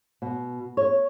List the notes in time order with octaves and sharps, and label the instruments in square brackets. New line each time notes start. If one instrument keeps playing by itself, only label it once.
[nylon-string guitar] B2
C#5